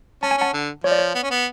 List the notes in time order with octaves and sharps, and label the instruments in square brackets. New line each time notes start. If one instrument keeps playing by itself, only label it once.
[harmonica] C#4 [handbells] A5
[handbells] G#5
[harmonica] C#4 [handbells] F#5 A5
[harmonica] D3
[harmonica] F3 [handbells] C#5
[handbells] D5
C#5
[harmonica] B3
C#4
B3